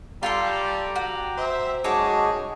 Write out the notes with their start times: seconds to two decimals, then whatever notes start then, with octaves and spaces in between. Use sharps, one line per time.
0.23 G3 F4 A4 G5 A#5 C6 D6
0.96 F#4
1.38 C5 E5
1.84 F#2 G#3 D#4 F#4 G#4 C#5 A5 D6